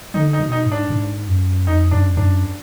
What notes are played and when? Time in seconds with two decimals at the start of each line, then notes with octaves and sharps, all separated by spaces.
0.14 D3 D#4
0.33 D#4
0.40 B2
0.52 D#4
0.66 G#2
0.72 D4
0.90 G#2
1.28 F#2
1.67 F2 D#4
1.91 F#2 D4
2.11 F2
2.17 F#2 D4